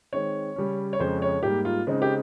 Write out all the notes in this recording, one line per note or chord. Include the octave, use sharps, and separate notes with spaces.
D#3 G#3 C4 C#5
C#3 G3 C#4
C#5
F2 C#3 F3 G#3 C#4 C5
C#5
G#2 G3 A#3 G4
F4
C#3 G#3 C4 D#4
G4